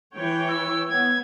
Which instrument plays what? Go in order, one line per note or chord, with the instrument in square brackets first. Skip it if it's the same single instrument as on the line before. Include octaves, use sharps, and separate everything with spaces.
[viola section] E3 C#5 G5
[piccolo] E6
[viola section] B3 [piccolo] G#6